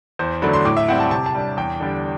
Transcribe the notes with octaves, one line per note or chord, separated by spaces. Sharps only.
E2 C5
D3 F#3 A3 D4 B5
C6
A2 D6
E5
G3 C4 E4 F#5
A5
C3 A5
A5
G3 D4
E2 G5
D3 G3 D4